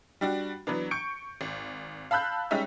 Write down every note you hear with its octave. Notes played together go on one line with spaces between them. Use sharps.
G3 D4 F#4
E3 F#3 B3 D4
C#6 G6 C#7 D7
G#1
F5 A5 B5 E6 F#6 G6
G3 G#3 C#4 D#4 E5